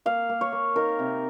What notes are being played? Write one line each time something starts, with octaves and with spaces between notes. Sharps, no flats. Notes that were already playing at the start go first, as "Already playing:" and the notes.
A#3 F5
A#3
C#5
A#3
D#4 A#4
C3